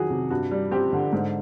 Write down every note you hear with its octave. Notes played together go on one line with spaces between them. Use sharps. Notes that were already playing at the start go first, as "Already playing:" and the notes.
Already playing: F2 D#3 F#3 F#4 G#4
C3
G2 F#4
G3
C4 G4
D3
G#2